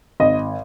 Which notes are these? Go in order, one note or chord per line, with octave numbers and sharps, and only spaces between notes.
G#1 D#5